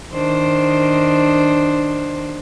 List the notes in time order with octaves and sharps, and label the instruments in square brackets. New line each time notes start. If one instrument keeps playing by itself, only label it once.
[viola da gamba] D#3 D4 C5